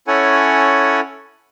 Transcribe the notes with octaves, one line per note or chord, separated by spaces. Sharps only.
C#4 E4 A4 C#5 F#5 G#5